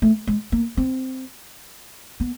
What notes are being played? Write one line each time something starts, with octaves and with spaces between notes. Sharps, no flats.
A3
G#3
A#3
C4
B3